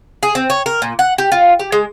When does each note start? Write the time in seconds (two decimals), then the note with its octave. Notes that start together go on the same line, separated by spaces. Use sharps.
0.23 G#4
0.35 C4
0.50 C#5
0.66 A#4
0.82 A#2
0.99 F#5
1.18 G4
1.32 F4
1.59 G4
1.72 G#3